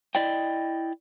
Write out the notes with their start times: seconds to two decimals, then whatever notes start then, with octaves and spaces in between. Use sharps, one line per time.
0.15 E4 D5 D#5 G5